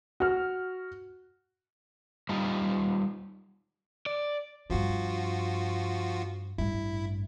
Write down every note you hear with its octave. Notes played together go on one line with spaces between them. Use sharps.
F#4 F6
G3 D#4 F4
D5
G2 F3 C4 F4 F#4
A1 G2 E4